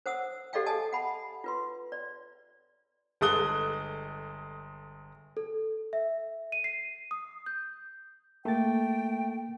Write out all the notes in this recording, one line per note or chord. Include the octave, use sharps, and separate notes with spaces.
C5 F#5 D#6 E6
G4 A4 D5 D#5 F5 G5
D#5 G#5 A5 D#6
F#5 B5
F4 B4 C6
D5
G1 G#3 A4 D#6 F#6 G7
A4
E5
D#7
C7
D#6
G6
A3 A#3 G5 A6